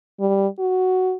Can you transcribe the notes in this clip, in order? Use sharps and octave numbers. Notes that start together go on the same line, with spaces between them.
G3
F#4